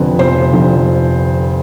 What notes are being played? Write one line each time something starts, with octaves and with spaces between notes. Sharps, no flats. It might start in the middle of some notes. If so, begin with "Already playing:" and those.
Already playing: F1 F2 D3 B4
F1 C5
F2 D3